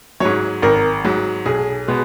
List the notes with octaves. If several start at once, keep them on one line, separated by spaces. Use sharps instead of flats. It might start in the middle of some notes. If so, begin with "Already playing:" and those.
G#2 F#3 C#5
G#1 A#4
G#2 F#3
B1 G#4
B2 G#3 B3